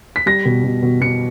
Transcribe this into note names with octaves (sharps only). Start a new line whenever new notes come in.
B6
G3 A#6
B2
B2
B2
B2 C#7